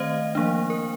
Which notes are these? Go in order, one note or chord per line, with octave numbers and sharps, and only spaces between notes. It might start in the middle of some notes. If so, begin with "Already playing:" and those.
Already playing: D#3 A3 C4 C5 D#5 F5
F3 A#3 D4
A#4